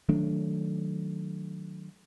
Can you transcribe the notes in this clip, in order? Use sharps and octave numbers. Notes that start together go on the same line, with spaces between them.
D#3 F#3 A3 D4